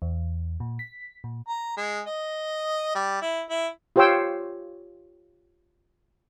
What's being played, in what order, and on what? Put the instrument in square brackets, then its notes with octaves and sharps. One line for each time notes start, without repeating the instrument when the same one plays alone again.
[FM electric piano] E2
A#2
B6
A#2
[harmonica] A#5
G#3
D#5
G3
E4
E4
[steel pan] F4 G4 C5 C#5 G5 E6